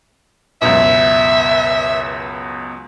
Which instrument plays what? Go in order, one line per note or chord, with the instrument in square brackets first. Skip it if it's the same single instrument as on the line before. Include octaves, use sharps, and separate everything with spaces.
[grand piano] C#2 F#2 B2 [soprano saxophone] E5